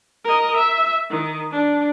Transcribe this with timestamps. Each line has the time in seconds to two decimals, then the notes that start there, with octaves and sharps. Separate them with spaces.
0.24 A#4 D#5
0.57 E5
1.10 D#3
1.51 D4